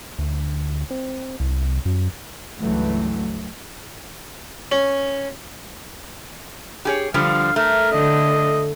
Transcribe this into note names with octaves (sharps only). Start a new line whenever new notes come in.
D2
C4
C2
F#2
C#2 G2 E3 F#3 A3
C#4
G4 G#4 C#5
D3 F3 G3 F5
A3 A#4
D3 D#5